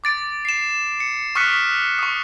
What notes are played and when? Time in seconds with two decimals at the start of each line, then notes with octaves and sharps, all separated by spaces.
0.04 D6 A6 D7
0.45 C7 E7
1.00 C#7
1.35 C#6 D#6 F6 F#6 B6 C#7
1.99 C#6 D#6